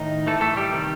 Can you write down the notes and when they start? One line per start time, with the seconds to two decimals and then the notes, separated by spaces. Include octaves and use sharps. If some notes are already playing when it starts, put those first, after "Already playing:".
Already playing: A2 D#3 D#4
0.27 A2 E3 A3 A4
0.41 A3 A4
0.56 G3 G4
0.72 C3 D#3